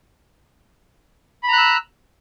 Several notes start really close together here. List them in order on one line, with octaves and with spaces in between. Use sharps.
B5 A#5 F#6 E6